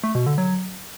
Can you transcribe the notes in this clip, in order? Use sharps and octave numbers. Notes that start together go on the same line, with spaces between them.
A3
B2
D3
F#3